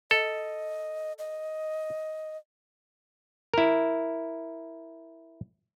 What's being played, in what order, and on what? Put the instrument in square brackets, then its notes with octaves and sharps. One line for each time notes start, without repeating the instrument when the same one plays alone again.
[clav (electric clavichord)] A4 [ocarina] D#5
[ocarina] D#5
[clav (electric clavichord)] E4 A#4